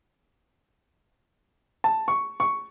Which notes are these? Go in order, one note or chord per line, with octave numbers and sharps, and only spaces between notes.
A5
C#6
C#6